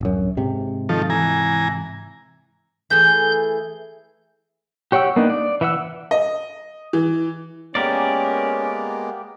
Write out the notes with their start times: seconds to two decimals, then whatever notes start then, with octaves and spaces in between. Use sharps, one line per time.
0.01 D1 F#2
0.37 G#2 C3
0.89 D#3 F3 A4
1.10 E3 G#5 A#5
2.90 E3 A3 G#4 G6
4.92 G4 C#5 F#5 G5 E6
5.16 A#3 B3 D4 D#4
5.30 D5
5.61 E3 E5 F#5 E6
6.11 D#5
6.93 E3
7.75 G#3 A#3 B3 C#4 G4 A#4 D5